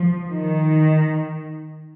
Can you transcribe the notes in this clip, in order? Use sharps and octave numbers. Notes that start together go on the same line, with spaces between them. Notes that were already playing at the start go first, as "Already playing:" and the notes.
Already playing: F3
D#3